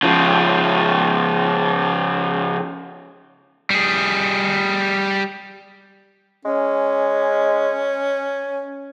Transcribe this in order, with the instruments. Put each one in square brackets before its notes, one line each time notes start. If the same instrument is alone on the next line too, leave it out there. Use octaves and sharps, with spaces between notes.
[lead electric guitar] C#3 F3
[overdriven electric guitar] G3 G#4
[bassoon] G#3 [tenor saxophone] C#4